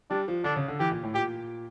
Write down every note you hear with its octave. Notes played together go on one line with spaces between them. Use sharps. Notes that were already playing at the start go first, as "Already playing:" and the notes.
G3 D4
F3
D3 D4
C#3
D3
E3 G4
A#2
A2
A#2 G4